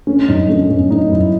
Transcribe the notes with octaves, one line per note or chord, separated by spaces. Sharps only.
A3 C#4
F#2 D#4
A3 C#4
F#2 C#4
A3 D#4
F#2 E4